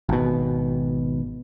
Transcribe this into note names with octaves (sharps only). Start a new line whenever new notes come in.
G#1 B2